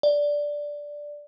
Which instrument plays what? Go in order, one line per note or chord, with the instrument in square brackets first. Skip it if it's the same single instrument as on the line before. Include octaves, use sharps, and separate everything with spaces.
[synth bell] D5